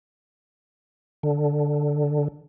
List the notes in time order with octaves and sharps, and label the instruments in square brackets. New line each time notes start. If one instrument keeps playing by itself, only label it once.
[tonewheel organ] D3